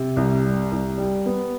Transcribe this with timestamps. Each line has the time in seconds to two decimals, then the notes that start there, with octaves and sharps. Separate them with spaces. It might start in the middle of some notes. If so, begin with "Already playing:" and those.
Already playing: C3
0.16 C2
0.45 G3
0.72 C2
0.98 G3
1.26 B3